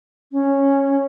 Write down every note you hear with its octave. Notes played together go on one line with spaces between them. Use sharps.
C#4